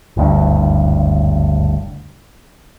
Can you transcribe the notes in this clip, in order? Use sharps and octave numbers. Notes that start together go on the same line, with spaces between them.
F#1 D2 G2